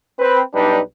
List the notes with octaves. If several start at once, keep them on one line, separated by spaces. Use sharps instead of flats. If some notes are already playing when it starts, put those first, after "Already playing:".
C4 B4
B1 G3 D4 D#4 B4